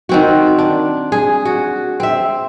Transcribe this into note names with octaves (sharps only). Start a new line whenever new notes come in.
D#3 C4 F#4
D4
G#4
F#4
C4 E5